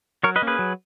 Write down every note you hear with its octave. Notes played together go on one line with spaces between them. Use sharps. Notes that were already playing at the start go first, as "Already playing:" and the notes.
F#3 A#4 C#5
B4 D#5
A#3 C#4
G#4 B4
F#3